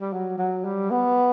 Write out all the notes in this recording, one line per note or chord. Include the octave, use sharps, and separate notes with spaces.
G3
F#3
F#3
G3
B3